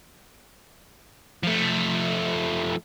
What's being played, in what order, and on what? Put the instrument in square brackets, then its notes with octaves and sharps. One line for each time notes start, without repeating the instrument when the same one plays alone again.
[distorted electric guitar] F3 A3